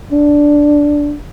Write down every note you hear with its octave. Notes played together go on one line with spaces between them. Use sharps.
D4